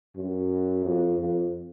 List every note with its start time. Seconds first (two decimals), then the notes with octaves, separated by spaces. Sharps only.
0.16 F#2
0.85 F2
1.19 F2